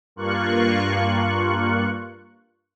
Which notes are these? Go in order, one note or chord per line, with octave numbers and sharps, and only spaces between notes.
G2 A#3 F4 C#6 F#6